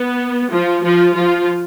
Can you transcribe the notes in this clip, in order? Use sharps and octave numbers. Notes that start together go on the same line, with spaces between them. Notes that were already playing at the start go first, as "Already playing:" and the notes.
Already playing: B3
F3 F4
F3 F4
F3 F4